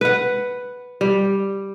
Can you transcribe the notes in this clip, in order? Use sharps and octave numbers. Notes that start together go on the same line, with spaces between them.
B4 F#5
G3